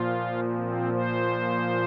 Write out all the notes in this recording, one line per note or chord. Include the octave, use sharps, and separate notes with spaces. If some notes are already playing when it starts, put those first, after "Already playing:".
Already playing: A#2 F3 F4
C4
C5